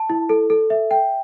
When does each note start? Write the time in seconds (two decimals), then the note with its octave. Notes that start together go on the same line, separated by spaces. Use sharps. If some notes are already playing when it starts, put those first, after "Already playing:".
Already playing: A5
0.10 E4
0.29 A4
0.50 A4
0.70 E5
0.91 G5